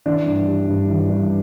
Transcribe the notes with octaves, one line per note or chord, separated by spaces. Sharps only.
E3 D4
G2
G3
G2
E3
G2